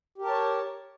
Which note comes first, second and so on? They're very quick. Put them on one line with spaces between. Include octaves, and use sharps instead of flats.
G4 A#4 A5 C#5